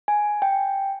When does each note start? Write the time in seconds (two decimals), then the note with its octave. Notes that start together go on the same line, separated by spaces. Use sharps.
0.08 G#5
0.42 G5